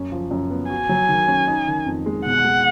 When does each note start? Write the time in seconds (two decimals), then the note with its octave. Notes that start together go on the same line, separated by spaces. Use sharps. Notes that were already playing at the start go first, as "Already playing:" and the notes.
Already playing: F#2 C#4
0.12 F3
0.31 F#2
0.51 B3
0.70 F#4 G#5
0.89 F#3
1.09 D#3
1.28 C#4
1.47 D#4
1.67 D#3
1.86 F2
2.06 G#3
2.26 B2 F#5
2.44 G#3